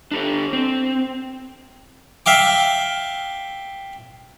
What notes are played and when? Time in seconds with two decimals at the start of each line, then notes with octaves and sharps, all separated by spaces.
0.11 D4 G4 A4
0.53 C4
2.26 E5 F5 G5 D6